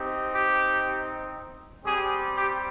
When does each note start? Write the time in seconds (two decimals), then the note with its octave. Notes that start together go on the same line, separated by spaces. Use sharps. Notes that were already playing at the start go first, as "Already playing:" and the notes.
Already playing: C4 D#4 G4
0.33 G4
1.84 G3 C4 G4 G#4
2.35 G4